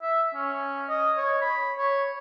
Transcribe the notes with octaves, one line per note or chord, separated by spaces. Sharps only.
E5
C#4
D#5
C#5
B5
C#5